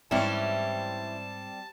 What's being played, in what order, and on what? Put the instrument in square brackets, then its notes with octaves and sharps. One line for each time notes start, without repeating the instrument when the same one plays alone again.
[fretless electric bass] G#2 [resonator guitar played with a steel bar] E3 C#4 E4 [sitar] G3 C4 [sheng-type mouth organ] A5